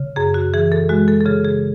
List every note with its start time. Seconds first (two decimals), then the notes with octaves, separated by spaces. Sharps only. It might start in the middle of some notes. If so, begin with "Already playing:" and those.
Already playing: C#3
0.16 F#2 G#4
0.34 F#4
0.54 E3 G#4
0.72 A4
0.89 G#3 F#4
1.08 A4
1.21 A4
1.25 C#3 G#4
1.45 G#4